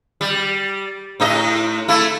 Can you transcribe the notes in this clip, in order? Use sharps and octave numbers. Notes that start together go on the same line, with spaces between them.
G3
A2 D#4 D#5
A3 E4